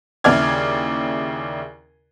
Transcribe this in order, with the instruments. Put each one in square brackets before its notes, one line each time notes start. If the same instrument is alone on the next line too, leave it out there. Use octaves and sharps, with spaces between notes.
[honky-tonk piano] D#2 C#3 E4 D5 F6 G#6